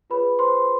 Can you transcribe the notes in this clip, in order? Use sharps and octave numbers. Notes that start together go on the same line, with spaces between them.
F4 G#4 B4 C#5 B5
C5 C6